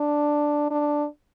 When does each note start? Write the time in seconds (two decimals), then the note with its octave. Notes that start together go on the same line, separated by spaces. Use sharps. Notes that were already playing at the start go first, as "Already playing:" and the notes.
Already playing: D4
0.71 D4